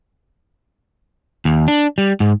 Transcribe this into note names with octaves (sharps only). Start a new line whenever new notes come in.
D#2
D4
G3
G#2